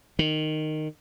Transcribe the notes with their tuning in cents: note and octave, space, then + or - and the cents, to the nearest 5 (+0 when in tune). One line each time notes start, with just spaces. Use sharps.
D#3 -10